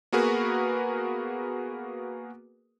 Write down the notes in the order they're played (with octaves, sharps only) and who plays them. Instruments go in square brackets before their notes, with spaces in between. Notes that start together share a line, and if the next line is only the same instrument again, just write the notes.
[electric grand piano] A#3 B3 F#4 G#4 A#4 B4